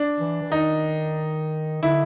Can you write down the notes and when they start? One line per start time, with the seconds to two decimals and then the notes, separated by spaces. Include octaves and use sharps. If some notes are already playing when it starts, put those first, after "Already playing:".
Already playing: D4
0.20 E3
0.43 E3
0.52 D#3 D#4
1.82 D3 E4